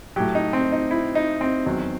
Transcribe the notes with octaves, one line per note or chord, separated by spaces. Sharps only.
A2 F#3 G4
D#4
C4
D#4
E4
D#4
C4
E2 D#3 F#3